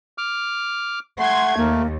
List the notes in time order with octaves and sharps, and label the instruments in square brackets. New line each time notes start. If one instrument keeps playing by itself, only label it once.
[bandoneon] D6 F6
[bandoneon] A3 [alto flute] F#5 [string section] C6 G#6
[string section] D#2 [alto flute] A#3